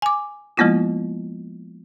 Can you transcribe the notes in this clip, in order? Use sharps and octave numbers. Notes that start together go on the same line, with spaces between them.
G#5 D6
F3 G#3 A#3 B3 E4 F4